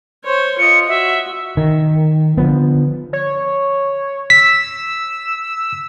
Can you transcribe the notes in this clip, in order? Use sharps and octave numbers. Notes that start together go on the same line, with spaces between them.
C5 C#5
F4 D#5 C#7
F#4 E5
D#3
D3 F3 B3
C#5
E6 B6